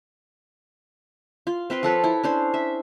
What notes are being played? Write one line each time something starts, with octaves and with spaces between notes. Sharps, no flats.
F4
C4 B4 F5 G5
F3 A4 B4 C#5
E4
C#4 D4 C5
E5